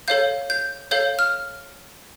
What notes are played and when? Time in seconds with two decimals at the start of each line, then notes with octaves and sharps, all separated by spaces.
0.08 A4 C#5 F5 G6
0.50 G6
0.91 A4 C#5 F5 G6
1.19 F6